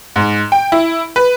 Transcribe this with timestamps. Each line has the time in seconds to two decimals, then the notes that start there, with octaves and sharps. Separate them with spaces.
0.16 G#2
0.52 G5
0.72 E4
1.16 B4